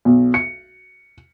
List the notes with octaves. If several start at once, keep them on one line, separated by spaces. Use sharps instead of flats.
B1
C#7